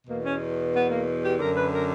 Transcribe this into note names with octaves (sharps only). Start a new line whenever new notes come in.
E2 B2 A#3
C#4
B3
A#3
G4
F#2 D3 A#4
B4
A#4